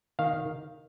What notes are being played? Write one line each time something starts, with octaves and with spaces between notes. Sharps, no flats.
D#3 F5